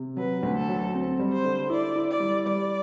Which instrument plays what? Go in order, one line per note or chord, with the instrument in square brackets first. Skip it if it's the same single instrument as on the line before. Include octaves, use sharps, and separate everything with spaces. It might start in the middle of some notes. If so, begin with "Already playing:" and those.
Already playing: [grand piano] C3
[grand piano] F#3 [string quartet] B4
[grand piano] D2
[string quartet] A4
[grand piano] F#3
C4
G3
[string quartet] C5
[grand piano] D3
[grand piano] E4 [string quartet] D5
[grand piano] E4
[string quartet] D5
[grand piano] G3
[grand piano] G3 [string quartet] D5